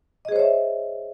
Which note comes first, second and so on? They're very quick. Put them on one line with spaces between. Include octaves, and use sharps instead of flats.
D#5 G#4 C5 C#5 E5